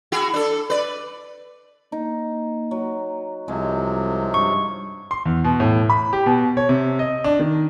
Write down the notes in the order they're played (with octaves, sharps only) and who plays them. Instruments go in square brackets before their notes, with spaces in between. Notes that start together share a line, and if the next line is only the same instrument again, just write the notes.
[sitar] E4 F#4 G#4
D4 A4
B4 D5
[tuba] A#3 [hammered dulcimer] D#4
[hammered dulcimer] F#3
[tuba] C2 [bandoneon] C3 F3 F#3 [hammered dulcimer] G#3
[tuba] G2 [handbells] C#6
[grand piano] C6
E2
B2
A2
B5
G4
B2
C#5
C3
D#5
D4
D#3